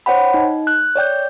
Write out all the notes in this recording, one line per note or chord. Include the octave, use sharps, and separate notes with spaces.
C5 C#5 F#5 G5 B5
D#4
F#6
C#5 D5 G5 G6